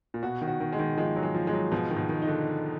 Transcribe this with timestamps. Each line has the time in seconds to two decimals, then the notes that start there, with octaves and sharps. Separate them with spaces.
0.14 A#2
0.23 B2 F#4
0.41 D#3
0.47 F#4
0.60 D#3
0.73 G#3
0.79 D#3
0.97 F3 G#3
1.16 F#3
1.23 G#3
1.35 F3
1.47 G#3
1.53 F#3
1.72 B2 F3
1.90 D#3
1.97 B2
2.09 D#3
2.22 D#4
2.28 D3